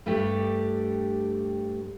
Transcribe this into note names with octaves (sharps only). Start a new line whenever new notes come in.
G2 G3 A3 D4 G4